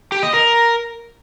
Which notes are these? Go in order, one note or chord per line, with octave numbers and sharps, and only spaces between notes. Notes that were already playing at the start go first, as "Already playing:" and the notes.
G4
D#5
A#4